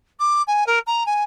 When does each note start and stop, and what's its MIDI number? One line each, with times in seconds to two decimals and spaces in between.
0.19 0.42 86
0.47 0.66 80
0.66 0.79 70
0.87 1.03 82
1.06 1.24 80